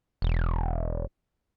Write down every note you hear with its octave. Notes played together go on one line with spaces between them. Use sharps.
E1